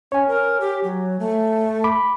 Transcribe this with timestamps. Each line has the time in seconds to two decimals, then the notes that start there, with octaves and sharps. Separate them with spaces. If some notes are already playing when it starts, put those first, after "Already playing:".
0.12 C#4 C#5 G#5
0.28 A#4
0.61 G4
0.84 F#3
1.20 A3
1.84 B5 D6